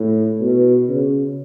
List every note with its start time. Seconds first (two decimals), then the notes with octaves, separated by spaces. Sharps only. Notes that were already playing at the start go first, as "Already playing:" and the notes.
Already playing: A2
0.41 B2
0.88 C#3